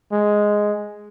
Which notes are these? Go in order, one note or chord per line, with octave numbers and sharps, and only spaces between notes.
G#3